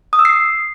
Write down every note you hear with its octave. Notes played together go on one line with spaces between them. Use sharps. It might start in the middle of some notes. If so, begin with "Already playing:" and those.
D#6
E6
C7